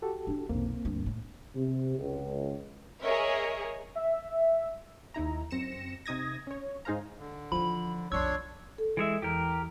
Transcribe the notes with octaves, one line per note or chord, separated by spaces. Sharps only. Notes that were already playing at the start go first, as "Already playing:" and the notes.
F#4 G4 A4
D4 E4
B1 F2 A#3 C4
D2 G2
A2
C3
C#2
G#4 A#4 C#5 D#5 E5
E5
D#2 D#4 E4 A#5
F#2 C4 A#6 C#7 E7
C3 D#4 D#6 G#6 A#6
C#4 C#5
G#2 D#4 G#4 C5 F5 A#5
D3
E3 F3 E4 B5
B1 F2 D4 C#5 C6 C#6 E6 G#6
A4
E3 G#3 E5
E2 E3 G4 A#4